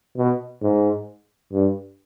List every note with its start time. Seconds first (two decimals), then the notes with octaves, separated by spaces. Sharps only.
0.17 B2
0.62 G#2
1.53 G2